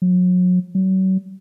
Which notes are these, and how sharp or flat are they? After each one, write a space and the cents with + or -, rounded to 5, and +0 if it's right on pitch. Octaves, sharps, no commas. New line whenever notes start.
F#3 -35
F#3 +35